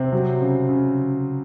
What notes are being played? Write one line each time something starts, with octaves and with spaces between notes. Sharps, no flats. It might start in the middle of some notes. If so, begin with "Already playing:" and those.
Already playing: C3 C4
F#3
C#3
C#3